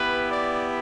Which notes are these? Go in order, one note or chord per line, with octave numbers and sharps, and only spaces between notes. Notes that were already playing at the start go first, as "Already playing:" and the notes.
Already playing: B3 E4 G4 B4
D5